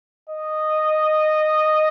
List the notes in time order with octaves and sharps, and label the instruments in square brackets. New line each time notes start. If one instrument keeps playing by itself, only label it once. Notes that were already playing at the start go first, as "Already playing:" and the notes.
[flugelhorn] D#5